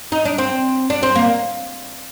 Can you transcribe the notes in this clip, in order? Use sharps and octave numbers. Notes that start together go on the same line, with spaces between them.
D#4
D4
C4
D4
C4
A#3